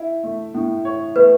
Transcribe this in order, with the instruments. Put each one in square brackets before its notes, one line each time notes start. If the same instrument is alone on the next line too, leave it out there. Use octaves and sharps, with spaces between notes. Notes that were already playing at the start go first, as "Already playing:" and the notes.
Already playing: [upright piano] E4
A3
A2
C#5
[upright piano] A3 [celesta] B4